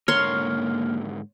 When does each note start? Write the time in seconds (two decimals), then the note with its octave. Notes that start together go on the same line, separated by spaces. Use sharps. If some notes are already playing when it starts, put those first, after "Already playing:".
0.08 G#2 D3 A#3 A#4 C#5 C6 F6